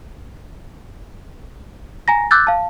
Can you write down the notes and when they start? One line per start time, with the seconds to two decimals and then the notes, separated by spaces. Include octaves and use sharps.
2.08 G#5 A#5 A#6
2.31 D6 E6 F#6 G6 A6
2.47 F5 A5